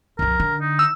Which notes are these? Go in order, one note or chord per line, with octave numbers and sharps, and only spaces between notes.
C2 F2 A#4
D3
D#4
E6